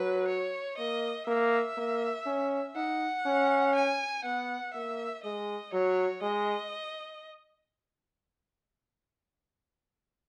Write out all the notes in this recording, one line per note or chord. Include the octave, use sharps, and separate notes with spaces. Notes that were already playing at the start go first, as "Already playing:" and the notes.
Already playing: F#3 B4
C#5
A#3 D#5
A#3 E5
A#3
C#4
D#4 F#5
C#4
G#5
B3 F#5
A#3 E5
G#3 D#5
F#3 C#5
G#3 D#5